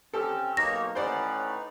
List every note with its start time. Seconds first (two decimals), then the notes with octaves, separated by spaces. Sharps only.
0.14 C4 C#4 G4 A4
0.57 B1 A#3 D#4 C#5 A#6
0.95 A2 C#4 D#4 B4 C5 D5 F#5